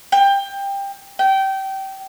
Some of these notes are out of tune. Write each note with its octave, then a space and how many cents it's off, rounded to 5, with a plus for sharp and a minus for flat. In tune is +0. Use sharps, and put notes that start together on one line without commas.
G5 +20
G5 -20